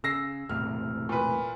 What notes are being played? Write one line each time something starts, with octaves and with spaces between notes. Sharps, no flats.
C#3 E6 A#6 C7
E1 A2 C3 F6
A#2 B4